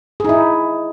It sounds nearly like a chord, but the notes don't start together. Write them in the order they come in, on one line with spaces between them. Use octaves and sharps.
G#4 D#4 E4